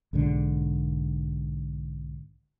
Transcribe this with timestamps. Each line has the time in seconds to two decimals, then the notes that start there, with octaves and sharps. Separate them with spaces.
0.13 B1 G#2 D3